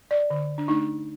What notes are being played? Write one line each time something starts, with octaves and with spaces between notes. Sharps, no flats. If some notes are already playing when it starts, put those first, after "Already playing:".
D5
D3
D4
A3 D4 D#4